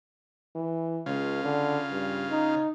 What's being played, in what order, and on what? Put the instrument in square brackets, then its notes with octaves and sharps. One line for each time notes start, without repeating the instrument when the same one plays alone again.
[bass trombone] E3
[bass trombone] C#2 [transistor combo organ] C#3 F4
[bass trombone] D3
G2
D#4